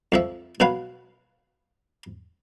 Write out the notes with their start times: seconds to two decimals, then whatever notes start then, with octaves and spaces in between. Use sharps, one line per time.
0.12 F2 F3 E5
0.60 B2 F#3 C#4 B4 F5